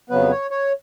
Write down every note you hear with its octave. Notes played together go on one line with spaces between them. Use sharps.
F2 C#3 F#3 B3 B4
C#5
C#5